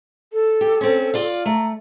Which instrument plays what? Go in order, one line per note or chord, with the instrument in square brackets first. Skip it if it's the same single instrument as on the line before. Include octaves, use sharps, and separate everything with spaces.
[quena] A4
[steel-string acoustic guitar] G4
C4 C#4
F4 D5 F5
[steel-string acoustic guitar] A3 [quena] A#5